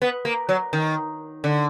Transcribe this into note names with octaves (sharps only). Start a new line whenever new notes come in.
B3
A#3
F#3
D#3
D3